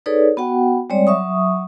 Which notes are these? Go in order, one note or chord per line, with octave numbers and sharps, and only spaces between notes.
D#4 G#4 A4 B4 C#5 D5
B3 F#4 F#5 G5
G3 G#3 C4 C#5 D5
F#3 E5 C#6 D#6